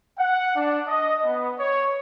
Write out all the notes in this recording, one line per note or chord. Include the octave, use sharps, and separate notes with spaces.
F#5
D4
D#5
B3
C#5